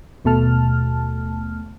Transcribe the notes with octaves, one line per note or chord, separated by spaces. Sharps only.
D#2 B2 A3 A5 F6